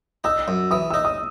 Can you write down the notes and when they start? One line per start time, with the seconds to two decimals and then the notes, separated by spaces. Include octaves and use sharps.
0.24 D#4 E6
0.48 F#2
0.71 E3 D#6
0.91 D#4 E6
1.05 D#6